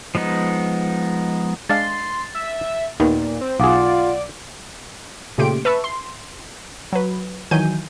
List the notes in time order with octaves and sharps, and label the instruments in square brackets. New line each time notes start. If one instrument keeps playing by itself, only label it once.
[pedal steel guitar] F3 G#3 B3 D#4
[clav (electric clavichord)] G#3 D4 F5 [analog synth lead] C6 [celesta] A6
[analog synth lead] E5
[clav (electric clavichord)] D#2 D#3 B3 [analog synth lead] A#2
[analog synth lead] C4
[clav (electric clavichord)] B1 G#4 [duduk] F4 [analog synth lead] D5 [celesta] F5 F#5 D6
[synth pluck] A#2 C#3 A3 G4 C6 D7
B4 E5 A5 C#6 E6
C6
F#3 B4
D#3 E3 F#3 G#5 G6 D#7